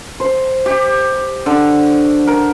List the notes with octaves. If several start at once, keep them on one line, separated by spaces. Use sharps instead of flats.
C5
G4
D3
A#4